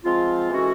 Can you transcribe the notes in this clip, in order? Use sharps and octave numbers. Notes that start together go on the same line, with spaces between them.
F3 G#3 C4 F4
E3 G#3 C#4 F#4 A4